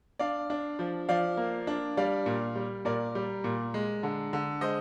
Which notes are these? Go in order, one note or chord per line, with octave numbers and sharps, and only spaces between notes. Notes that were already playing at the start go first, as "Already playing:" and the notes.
D4 D5 F5
D4
F3
F3 D5 F5
A#3
D4
G3 D5 F5
A#2
G3
A#2 A#4 D5
G3
A#2
G#3
D3
D3
G#3 C5 D#5